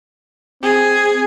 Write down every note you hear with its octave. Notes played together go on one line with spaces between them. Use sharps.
C4 G#4